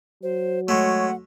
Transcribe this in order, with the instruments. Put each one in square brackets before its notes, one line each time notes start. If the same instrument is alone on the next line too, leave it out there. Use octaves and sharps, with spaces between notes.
[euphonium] F#3 [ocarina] C5
[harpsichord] G#3 A3 [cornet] C#5 [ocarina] F#5